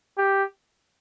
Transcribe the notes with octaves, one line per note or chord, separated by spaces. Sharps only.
G4